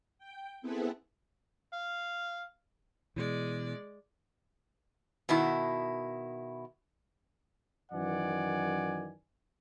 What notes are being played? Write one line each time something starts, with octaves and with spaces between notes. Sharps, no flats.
G5
B3 C4 E4 G#4 A4 B4
F5
B2 E3 G#3 D5
B2 D#3 E4
F#2 D#3 E3 D5 F#5 G#5